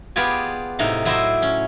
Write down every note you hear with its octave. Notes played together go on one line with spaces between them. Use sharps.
B3 F4 G4 G#4 D5 G#5
A2 C3 D#4 F5
F#3 E4 C5 D5 D#5
C#4